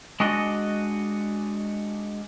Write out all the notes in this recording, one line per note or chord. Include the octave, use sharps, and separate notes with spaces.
G#3 D4 F#4 D#5